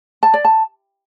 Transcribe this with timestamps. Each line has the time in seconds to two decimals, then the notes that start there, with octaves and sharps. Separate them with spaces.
0.23 A5
0.34 D5
0.45 A5